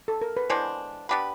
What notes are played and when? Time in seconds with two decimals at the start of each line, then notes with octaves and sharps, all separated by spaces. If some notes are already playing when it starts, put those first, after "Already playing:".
0.08 A4
0.22 A#4
0.37 B4
0.50 E3 G#3 B3 D4 C5
1.09 B3 D4 G4 B4